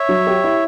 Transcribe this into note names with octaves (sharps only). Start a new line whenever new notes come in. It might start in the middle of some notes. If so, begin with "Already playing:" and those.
Already playing: C#5 E5
F#3
G4
E4